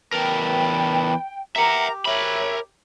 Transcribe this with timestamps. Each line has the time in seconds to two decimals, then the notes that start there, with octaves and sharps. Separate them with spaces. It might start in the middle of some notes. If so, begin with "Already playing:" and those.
0.13 E2 A#4 B4 G5 A5 B5
1.56 G4 A#4 E5 F#5 A#5
2.05 A#4 C#5 E5 B5